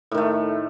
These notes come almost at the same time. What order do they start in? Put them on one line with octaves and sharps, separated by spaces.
A2 D#3 A3